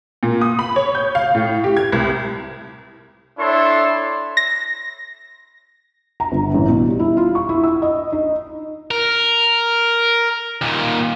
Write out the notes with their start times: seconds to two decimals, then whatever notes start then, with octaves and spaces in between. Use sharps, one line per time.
0.23 A#2
0.41 D#6
0.59 B5
0.76 C#5
0.95 G6
1.15 F5
1.35 A2
1.64 G4
1.77 G#6
1.92 C2
3.39 D4 E4 A4 C#5 E5 C6
4.37 A#6
6.20 A#5
6.32 G1
6.54 A1
6.69 B2
6.87 G3
7.00 E4
7.17 F4
7.35 C#6
7.49 E4
7.64 E6
7.82 D#5
8.12 D#4
8.91 A#4
10.61 D#2 A#2